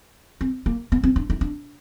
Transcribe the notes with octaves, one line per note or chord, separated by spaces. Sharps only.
C4
A#3
B3
C4
D4
D#4
D4